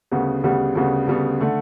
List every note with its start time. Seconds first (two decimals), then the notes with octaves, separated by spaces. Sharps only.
0.11 D2 C#3 G3 B3
0.44 D2 C#3 G3 B3
0.75 D2 C#3 G3 B3
1.07 D2 C#3 G3 B3
1.40 D3 A3